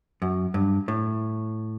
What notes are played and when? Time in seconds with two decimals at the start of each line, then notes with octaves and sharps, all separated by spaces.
0.22 F#2
0.54 G2
0.88 A2